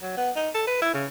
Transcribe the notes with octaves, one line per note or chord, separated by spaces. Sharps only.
F#3
B3
D#4
A4
B4
E4
C#3